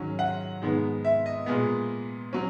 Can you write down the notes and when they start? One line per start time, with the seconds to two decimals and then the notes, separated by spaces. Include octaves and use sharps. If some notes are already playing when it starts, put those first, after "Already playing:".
Already playing: G#2 D#3 F#3 C#4
0.19 F#5
0.62 G#2 D#3 G#3 B3
1.05 E5
1.26 D#5
1.46 A#2 G#3 B3 G#4
2.33 F#3 C#4